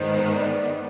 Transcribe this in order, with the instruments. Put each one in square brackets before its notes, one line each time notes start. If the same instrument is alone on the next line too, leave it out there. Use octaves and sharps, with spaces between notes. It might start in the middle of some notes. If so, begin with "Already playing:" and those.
Already playing: [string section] G#2 D#3 B3 [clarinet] C5
[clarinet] D5